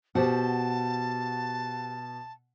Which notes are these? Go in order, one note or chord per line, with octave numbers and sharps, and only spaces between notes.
B2 G4 C5 F#5 A5